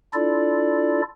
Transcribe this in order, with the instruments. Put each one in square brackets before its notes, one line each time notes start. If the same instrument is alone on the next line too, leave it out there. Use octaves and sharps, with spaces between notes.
[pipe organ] D4 E4 F4 A4 D5